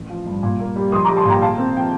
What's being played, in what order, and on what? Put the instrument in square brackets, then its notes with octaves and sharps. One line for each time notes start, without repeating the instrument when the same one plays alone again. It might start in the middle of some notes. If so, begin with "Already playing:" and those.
Already playing: [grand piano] A1
F3
G2
A#2
A#3
G3
[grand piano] A#1 [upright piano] C6 D#6
[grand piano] G3 [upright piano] A#5 D6
[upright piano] A5 C6
[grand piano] A#2 [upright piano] G5 A#5
[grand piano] A#2 [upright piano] F5 A5
[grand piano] C4
[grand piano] F3 [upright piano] G5